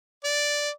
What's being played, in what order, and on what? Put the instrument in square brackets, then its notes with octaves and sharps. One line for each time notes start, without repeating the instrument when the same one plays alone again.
[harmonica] D5